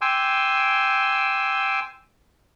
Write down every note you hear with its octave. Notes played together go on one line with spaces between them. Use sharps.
G5 G#5 C6 D6 E6